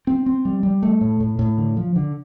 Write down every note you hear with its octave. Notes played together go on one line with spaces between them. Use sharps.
C4
C4
G3
G3
A3
A2
A2
A2
D3
F3
D3